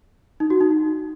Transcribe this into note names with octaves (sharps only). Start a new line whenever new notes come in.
D#4
F#4
D#4
D#4